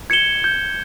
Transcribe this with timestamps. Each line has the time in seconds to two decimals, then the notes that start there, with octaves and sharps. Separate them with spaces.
0.10 G#6 C#7 E7 G7
0.44 G6